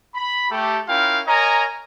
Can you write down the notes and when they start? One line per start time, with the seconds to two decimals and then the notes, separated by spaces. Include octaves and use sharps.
0.15 B5
0.50 A3 G4 A4
0.88 C#4 E4 F4 A#4 F5 G5
1.27 A#4 C#5 D#5 G#5 A#5